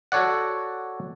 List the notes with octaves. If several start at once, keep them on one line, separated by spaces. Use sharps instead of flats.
F#4 A4 C#5 D5 F#5